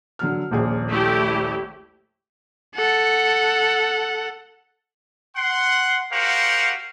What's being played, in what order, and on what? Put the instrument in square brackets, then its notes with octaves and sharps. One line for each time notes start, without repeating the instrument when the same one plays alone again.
[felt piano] D3 F#3 F6
D#1 A#1 G#4
[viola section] A3 E4 G4
[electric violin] A4 F#5
[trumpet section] F#5 C6
F#4 G4 A#4 C5 F5 F#5